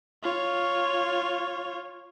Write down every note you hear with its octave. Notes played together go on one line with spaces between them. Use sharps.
F4 C#5